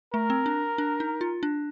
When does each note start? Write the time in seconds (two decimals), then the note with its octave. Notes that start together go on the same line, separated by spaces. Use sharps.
0.14 A3 A#4
0.30 C4
0.46 D4
0.78 D4
1.00 D#4
1.21 F4
1.43 D4